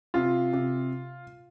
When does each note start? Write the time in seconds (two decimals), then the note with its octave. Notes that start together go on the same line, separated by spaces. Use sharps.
0.14 C3 F4
0.53 C3